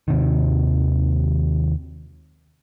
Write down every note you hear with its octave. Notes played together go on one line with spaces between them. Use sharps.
D#2 C3 D#3